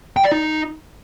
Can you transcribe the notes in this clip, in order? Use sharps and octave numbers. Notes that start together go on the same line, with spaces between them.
G5
D5
D#4